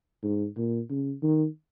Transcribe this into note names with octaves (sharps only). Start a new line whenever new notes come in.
G#2
A#2
C#3
D#3